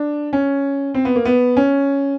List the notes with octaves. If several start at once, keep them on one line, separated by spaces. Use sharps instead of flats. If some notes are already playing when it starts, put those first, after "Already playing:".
Already playing: D4
C#4
C4
B3
A#3
B3
C#4